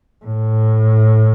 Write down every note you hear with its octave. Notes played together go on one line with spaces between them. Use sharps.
A2